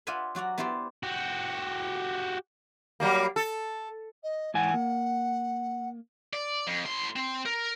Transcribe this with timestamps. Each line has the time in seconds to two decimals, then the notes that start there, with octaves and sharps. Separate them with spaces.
0.07 F4 D5 E5 F#5 G#5 B5
0.35 F#3 F#4 D5 A#5
0.58 B3 E4 G4 C5 D5
1.03 F#4 G4
3.00 F#3 G3 A#3
3.36 A4
4.23 D#5
4.54 G#2 E3 F#5 G#5
4.74 A#3
6.33 D5
6.67 F2
6.85 A2 C6
7.16 C4
7.46 A#4